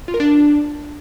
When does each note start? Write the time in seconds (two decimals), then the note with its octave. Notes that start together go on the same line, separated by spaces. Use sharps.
0.08 F4
0.14 A#4
0.20 D4